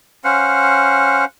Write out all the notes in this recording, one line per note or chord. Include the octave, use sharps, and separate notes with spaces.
C#4 C5 F5 F#5